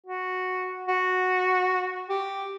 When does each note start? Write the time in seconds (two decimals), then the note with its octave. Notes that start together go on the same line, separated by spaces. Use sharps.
0.06 F#4
0.88 F#4
2.09 G4